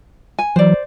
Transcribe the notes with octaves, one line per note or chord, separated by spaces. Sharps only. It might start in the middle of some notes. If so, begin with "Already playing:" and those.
G#5
E3 F#3 C5 D5